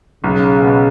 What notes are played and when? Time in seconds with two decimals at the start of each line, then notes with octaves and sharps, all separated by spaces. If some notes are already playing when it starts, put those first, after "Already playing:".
0.24 B1 C#3
0.62 B2